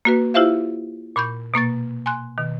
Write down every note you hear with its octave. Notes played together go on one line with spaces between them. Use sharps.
A#3 F#4 B4
E4 F4 G4 C5 E5 F5
A#2 B5 C#6 G6
B2 A#3 C#6 A6
G#5 C6 F#6
B2 D#3